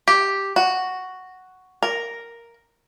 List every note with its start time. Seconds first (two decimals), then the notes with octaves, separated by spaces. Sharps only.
0.08 G4
0.56 F#4
1.83 A#4